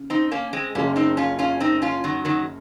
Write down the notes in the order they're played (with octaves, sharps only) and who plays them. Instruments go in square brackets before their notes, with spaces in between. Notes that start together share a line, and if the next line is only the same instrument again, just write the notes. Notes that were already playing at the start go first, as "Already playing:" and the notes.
Already playing: [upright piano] C#3
[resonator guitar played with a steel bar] C4 D#4
A#3 C#4
G#3 C4
[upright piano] F#1 F#2 C#3 G#3 [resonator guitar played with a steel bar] A#3 C#4
[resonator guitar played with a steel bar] C4 D#4
C#4 F4
C#4 F4
C4 D#4
C#4 F4
D#3 F#3
D#3 F#3